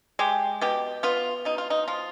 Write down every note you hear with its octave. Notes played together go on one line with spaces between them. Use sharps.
G#3 G4
B2 G4
B3 F4
B2 D#4
F4
D#4
F3 F4